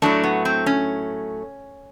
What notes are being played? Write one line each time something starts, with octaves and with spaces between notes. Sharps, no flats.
A2 F#3 A3 D4
B3
C4
C#4